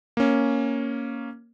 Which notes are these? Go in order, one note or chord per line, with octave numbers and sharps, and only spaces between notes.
A#3 C#4